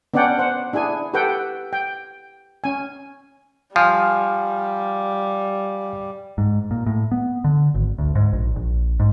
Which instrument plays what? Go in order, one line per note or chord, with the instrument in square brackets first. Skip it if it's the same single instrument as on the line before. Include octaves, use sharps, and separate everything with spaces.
[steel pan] B3 C#4 D4 D5 F#5 G5
C5 F#5
D4 E4 G#4 G#5
G4 A4 B4 F#5 G5
G5
C#4 G#5
[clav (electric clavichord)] F3 [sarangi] G3 [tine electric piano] F5 G#5
[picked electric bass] G#2
A#2
A2
B3
D3
G#1
D2
G#2
A#1
A#1
G#2